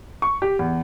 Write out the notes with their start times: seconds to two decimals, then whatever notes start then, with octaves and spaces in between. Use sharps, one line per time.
0.22 C#6
0.42 G4
0.59 E2